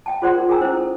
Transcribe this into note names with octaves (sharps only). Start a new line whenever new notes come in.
E5 G5 A5
F4 G#4 C5 D5 F#5 C6
D#4 A#4
G#4 A#4 G5 G#5 A#5 E6
C#4 E4 C5
A4